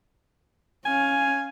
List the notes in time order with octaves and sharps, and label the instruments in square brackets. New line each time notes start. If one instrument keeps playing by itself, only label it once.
[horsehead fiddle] C#4 F5 [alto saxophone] G#5